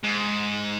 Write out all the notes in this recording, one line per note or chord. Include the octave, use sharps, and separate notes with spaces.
G#2